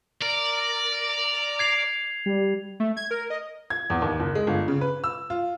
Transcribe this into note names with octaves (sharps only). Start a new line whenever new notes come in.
A#4 D5
G#6 C7 F7
G3
A3
G#6
A#4
D#5
G#6
E2
D#2
F#1
G#3
G1
C#3
B4
E6
F4